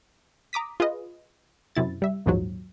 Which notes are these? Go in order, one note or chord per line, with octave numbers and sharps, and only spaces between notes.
A#5 D6 D#6 B6
F4 G#4 B4 D#5
F#2 C3 E4 A6
G3 E5
A#1 D#2 G#2 F3 F#3